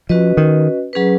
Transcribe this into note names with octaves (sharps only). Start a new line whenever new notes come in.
F3 C#4 F#4 B4 D#5
D#3
F#3 C#4 G#4 B4